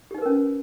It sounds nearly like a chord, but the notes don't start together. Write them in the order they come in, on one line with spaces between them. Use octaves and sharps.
G4 D#4 B4 A#4 C#4